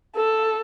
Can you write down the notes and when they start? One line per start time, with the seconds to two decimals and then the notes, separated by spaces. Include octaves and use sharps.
0.16 A4